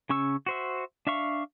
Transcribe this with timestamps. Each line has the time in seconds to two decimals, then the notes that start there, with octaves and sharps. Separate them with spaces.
0.09 C#3 C#4 C#6 E6
0.46 F#4 C5 E5
1.07 D4 E5 F5 C#6